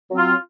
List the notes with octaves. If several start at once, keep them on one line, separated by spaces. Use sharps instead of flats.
F#3 C4 F4